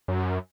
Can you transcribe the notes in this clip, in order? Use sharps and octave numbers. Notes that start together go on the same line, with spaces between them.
F#2